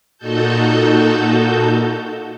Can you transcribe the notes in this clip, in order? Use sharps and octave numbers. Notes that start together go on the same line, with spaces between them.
A#2 D#4 F#4 A4 A5 G6